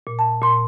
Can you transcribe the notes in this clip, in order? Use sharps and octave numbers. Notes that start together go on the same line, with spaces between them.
A#2
A5
A#2 C6